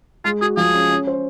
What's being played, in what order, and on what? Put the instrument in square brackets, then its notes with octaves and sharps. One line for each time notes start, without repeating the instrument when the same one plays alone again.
[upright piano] G#3 [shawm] F4
[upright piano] F#4 [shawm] G#4
[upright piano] F3 [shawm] G#4
[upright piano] C#4
C#4
C5